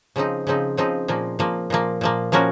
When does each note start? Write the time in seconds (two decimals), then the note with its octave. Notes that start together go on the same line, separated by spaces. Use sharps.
0.16 C#3 F3 C4 D#4
0.47 C#3 F3 C4 D#4
0.77 C#3 F3 C4 D#4
1.08 A#2 F3 A#3
1.39 A#2 F3 A#3
1.70 A#2 F3 A#3
2.01 A#2 F3 A#3
2.32 F3 A#3 C#4 F#4 A#4